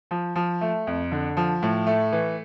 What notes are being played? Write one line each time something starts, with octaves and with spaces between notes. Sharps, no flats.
F3
F3
A3
F2
D3
F3
A2
A3
E3